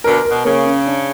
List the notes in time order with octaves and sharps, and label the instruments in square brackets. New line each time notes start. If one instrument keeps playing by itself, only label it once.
[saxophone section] B2 D3 [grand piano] A#4
[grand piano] A#4
[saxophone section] B2
[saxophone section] C#3 [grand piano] A#3
[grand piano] C#4
D4